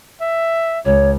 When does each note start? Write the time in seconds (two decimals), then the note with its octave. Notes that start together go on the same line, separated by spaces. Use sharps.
0.21 E5
0.85 C#2 C#5